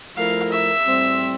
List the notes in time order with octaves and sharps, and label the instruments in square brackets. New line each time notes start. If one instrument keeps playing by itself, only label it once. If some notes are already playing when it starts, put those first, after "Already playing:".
[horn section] F3 A3 E4 A#4 [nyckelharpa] F5
[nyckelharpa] E5
[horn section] A2 G3 C4